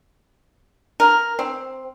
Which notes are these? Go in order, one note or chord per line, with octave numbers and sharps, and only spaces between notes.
A#4
C4